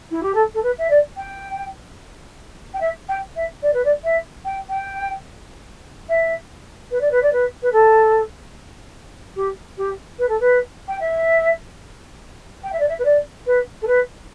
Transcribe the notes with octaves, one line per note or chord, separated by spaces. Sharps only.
E4
G4
A4
A4
B4
E5
D5
G5
G5
E5
G5
E5
D5
B4
D5
E5
G5
G5
E5
B4
D5
B4
D5
B4
B4
A4
G4
G4
B4
A4
B4
G5
E5
G5
E5
D5
E5
B4
D5
B4
A4
B4